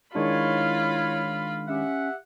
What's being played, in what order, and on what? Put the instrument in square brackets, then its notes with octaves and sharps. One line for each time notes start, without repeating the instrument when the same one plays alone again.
[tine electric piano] D#3 G#3 D4 [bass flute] E4 [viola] F4 B5 [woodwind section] C#5
[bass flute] C#4 [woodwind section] G4 E5 F#5